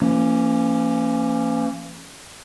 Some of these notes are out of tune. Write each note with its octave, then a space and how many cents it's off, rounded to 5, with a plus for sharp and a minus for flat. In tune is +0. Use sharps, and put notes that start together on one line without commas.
E3 +45 A#3 -20 C#4 -10